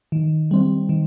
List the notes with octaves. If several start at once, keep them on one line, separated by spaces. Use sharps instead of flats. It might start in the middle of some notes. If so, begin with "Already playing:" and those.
D#3
G3 C4
D#3